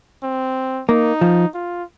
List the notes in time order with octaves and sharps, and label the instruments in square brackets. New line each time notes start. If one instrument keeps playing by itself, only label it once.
[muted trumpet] C4
[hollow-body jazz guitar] A#3 [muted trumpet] D#4
[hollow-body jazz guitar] F3
[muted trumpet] F4